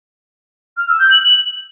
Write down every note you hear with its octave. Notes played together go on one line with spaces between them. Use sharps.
F6
E6
G6
F#7
F#7